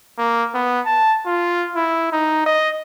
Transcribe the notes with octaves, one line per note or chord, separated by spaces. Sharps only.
A#3
B3
A5
F4
E4
D#4
D#5